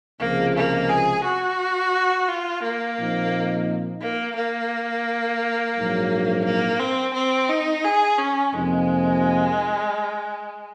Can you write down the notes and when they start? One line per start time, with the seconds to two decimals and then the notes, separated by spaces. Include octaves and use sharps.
0.20 C#2 C3 F3 G#3 A#3
0.55 A#3
0.89 G#4
1.24 F#4
2.29 F4
2.63 A#3
2.98 A#2 F3 C4 D#4
4.02 A#3
4.36 A#3
5.76 A#1 G#2 F#3
6.45 A#3
6.80 C4
7.14 C4
7.49 D#4
7.84 G#4
8.18 C#4
8.52 F2 C3 F3 G#3 A#3 D#4